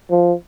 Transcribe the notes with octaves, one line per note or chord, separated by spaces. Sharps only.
F3